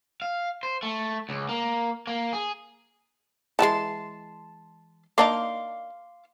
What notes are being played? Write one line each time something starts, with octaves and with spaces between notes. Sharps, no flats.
F5
C5
A3
C#2
A#3
A#3
G#4
E3 G3 G#3 A5 C6
A#3 D4 D#4 F5 C6 D6